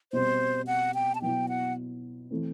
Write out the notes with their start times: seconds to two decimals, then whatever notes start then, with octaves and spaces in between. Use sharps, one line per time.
0.13 B2 G3 C4 C5
0.67 F#5
0.94 G5
1.15 A5
1.22 B2 F#3 B3 E4 G5
1.49 F#5
2.31 E3 A3 C4